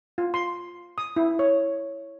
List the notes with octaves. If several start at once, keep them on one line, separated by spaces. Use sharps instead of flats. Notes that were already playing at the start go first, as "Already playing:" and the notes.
F4
C6
D#6
E4
C#5